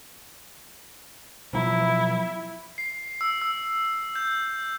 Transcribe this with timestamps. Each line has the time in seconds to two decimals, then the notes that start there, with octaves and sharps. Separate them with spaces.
1.53 B2 F3 F#3 E4
2.78 C7
3.21 E6
3.42 E6
4.15 G6